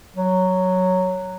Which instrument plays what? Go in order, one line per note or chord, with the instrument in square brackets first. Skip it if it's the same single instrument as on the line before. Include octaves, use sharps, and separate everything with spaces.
[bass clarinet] F#3